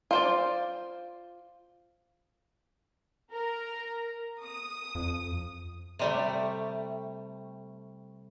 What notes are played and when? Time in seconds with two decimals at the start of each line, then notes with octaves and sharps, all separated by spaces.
0.11 F4 C5 D5
3.31 A#4
4.42 D#6
4.95 F2
5.99 C3 G3 A3